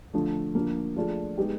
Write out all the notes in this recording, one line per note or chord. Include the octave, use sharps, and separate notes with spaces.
D3 F3 A3
D3 F3 A#3
F3 A3 D4 F4 G#4
G#3 B3 D#4 G4